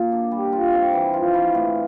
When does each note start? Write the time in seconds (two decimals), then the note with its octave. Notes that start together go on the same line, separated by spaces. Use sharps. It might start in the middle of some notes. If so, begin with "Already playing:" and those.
Already playing: A#2 F#3 A#3
0.12 D4
0.31 G3
0.53 F4
0.73 C4
0.93 E3
1.14 F4
1.34 E3
1.55 A2